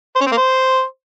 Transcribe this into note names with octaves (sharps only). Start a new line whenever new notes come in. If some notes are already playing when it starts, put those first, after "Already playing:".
C5
C#4
C4
A#3
C5